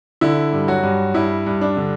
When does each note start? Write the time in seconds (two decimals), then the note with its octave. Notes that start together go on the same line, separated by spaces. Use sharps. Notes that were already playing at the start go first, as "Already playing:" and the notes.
0.21 D3 E4
0.53 G2
0.68 F#3 F#4
0.83 G2
1.14 G2 E4
1.46 G2
1.61 D4
1.77 D3